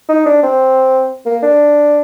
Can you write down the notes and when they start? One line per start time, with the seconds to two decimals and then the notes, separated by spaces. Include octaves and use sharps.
0.09 D#4
0.26 D4
0.43 C4
1.26 A#3
1.43 D4